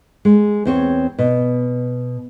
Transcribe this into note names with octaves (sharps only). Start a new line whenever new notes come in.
G#3
E2 C4 C#5
B2